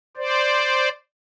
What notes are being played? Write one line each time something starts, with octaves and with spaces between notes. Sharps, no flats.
C5 D5